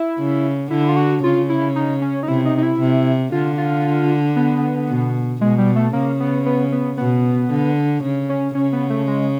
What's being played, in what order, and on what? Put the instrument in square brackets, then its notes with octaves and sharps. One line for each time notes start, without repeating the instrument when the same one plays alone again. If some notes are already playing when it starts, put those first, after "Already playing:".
Already playing: [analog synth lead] E4
[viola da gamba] C#3
[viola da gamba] D3 [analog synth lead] E4
[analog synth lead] F4
F#4
[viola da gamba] C#3 [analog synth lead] F4
[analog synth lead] E4
D#4
C#4
D#4
[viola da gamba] C3 [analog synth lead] E4
[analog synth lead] D#4
D#4
E4
[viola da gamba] C3
[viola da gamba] D3 [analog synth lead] F4
[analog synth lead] F4
B3
[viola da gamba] B2
[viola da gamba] B2 [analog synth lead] G#3
[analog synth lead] G3
A3
[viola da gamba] C#3 [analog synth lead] A#3
[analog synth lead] B3
B3
B3
[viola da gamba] B2 [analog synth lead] B3
[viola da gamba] D3
C#3
[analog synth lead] C#4
[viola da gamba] C#3 [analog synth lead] C#4
[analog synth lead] B3
A3
G#3